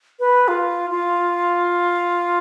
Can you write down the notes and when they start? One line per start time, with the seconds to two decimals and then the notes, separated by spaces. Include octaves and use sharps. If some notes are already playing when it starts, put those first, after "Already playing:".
0.20 B4
0.48 F4
0.90 F4